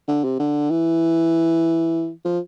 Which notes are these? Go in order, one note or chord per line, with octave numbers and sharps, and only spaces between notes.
D3
C3
D3
E3
F3